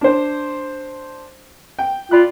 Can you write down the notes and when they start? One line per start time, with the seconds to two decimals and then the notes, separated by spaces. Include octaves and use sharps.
0.01 D4 C5
1.79 G5
2.11 F4 D5 B5 F#6